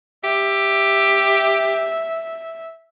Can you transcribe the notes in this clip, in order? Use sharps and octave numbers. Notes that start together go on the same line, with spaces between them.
G4 E5